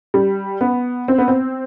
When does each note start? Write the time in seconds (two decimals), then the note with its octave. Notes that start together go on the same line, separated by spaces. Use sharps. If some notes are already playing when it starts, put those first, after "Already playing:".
0.14 G3
0.61 B3
1.08 C4
1.18 B3
1.28 C4